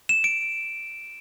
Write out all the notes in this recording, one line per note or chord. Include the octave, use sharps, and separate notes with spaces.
E7
D7